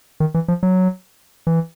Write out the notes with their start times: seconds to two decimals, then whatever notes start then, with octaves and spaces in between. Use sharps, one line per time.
0.20 D#3
0.34 E3
0.48 F3
0.63 F#3
1.47 E3